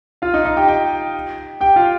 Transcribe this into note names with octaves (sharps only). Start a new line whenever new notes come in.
F4 F5
D#4 D#5
D#4 D#5
G4 G5
G4 G5
G4 G5
F4 F5